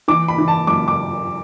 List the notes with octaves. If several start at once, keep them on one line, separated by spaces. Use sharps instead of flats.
E3 D6
B5
E3
A5
F#2 D6
D6